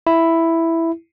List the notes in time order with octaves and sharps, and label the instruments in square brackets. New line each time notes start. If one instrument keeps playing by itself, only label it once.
[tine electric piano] E4